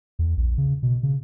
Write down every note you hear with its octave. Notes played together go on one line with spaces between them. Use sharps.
E2
A#1
C#3
B2
C#3